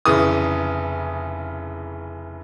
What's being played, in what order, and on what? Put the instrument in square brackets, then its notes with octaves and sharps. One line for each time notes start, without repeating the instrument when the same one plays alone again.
[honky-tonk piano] F1 C#3 E3 D#6